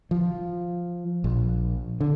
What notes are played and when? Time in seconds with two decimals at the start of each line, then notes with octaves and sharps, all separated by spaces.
0.11 F3
1.24 A#1
2.01 D3